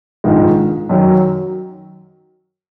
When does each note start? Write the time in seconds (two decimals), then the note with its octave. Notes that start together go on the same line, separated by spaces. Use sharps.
0.24 A#1 G#2 D#3 G#3
0.89 F#2 D#3 F#3